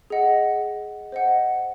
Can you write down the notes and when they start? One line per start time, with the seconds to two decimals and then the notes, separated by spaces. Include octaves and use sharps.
0.10 G#4 D#5 F#5
1.12 C5 D#5 F#5